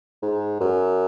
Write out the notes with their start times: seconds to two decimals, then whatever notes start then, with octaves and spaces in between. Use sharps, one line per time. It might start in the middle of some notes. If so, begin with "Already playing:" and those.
0.22 G#2
0.60 F#2